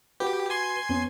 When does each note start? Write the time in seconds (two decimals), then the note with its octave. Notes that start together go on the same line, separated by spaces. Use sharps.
0.20 F#4 G4 B4
0.50 G#5 C6
0.89 F2 B3 C#4